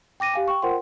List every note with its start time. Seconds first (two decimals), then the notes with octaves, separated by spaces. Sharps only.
0.20 G5 D6 A#6 D#7
0.34 G4 F5 G#5
0.48 G5 C#6
0.62 F4 A#4 C5 F#5 G5 C6